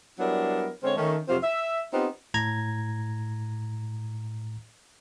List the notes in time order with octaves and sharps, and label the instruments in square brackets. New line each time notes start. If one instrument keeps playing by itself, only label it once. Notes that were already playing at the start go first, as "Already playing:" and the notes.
[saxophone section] F#3 G3 B3 D4 E4 A#4
D3 G#3 C4 C#4 C5 C#5
D#3 A3 C#4
F2 C3 F#3 F4 C5 F5
E5
B3 C4 D#4 F4 G4
[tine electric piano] A2 A#5 G#6